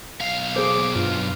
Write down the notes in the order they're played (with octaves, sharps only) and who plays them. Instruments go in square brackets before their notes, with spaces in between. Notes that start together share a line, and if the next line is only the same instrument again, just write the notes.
[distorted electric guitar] B1 F5
[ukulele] G#4 C5 [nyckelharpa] D6
[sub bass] G2 [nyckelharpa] F4